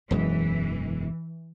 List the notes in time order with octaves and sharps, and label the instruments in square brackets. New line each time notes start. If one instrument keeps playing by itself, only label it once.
[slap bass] E1 F#2 G#3 [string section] E3